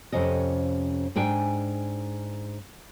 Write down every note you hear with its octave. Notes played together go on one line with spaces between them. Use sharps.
F2 C3 C#4 D#5
G#2 D4 G5 G#5